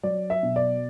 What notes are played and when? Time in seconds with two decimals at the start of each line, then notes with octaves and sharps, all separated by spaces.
0.03 F#3 D5
0.30 E5
0.43 B2
0.56 D5